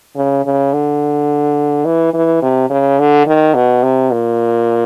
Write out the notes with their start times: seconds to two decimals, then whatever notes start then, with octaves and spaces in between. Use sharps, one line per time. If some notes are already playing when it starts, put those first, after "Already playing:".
0.16 C#3
0.46 C#3
0.73 D3
1.85 E3
2.14 E3
2.42 C3
2.70 C#3
2.99 D3
3.27 D#3
3.55 B2
3.83 C3
4.11 A#2